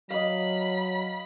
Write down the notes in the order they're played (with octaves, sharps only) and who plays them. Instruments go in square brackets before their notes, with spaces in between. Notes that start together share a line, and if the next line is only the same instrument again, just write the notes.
[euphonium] F#3 [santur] D#5 F5 [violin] B5